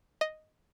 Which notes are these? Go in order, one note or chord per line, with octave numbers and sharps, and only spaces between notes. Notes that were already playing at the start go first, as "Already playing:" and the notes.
D#5